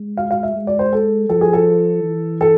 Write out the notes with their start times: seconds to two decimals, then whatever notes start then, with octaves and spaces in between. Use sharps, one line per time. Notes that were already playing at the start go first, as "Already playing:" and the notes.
Already playing: G#3
0.17 F5
0.31 F5
0.43 E5
0.56 G#3
0.67 D5
0.79 C5
0.93 A4
1.29 F3 A4
1.41 G#4
1.53 A4
2.03 E3
2.41 A4